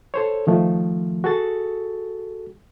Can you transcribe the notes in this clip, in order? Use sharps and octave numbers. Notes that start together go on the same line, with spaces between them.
A4 C5 C#5
D#3 F3 A3
F#4 G#4 A4 A6